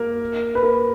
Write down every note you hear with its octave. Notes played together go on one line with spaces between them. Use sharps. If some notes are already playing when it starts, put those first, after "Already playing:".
Already playing: A#3 A#4
B4
A#3 A#4